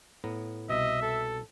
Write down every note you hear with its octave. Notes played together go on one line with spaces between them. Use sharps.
A2 B3 A#5
C2 B2 D#5 E5
A4